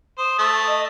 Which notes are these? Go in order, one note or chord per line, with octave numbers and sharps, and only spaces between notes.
C5 D#6
A3
D#5